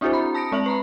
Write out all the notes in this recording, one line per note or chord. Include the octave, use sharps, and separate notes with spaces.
C4 D4 E4 F#4 G#4 C5
A#5 B5
A5 D#6 A#6 C#7 D7
G#3 C4 E5 F#7
B4 A#5 B5